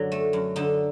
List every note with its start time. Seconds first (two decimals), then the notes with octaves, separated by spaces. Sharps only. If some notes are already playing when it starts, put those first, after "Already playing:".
Already playing: F#2 D3 F#3
0.12 A3
0.33 F#2
0.56 D3 D#4